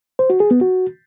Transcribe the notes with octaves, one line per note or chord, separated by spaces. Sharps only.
C5
F#4
G#4
B3
F#4